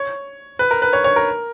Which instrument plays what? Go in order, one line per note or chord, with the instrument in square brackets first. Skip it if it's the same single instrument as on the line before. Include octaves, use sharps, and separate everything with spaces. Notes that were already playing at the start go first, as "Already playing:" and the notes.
Already playing: [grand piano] C#5
B4
A#4
B4
C#5
C#5
A#4